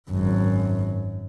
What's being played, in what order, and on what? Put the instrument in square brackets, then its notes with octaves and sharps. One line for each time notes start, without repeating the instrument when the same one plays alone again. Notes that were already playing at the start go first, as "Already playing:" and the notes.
[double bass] G#1 F#2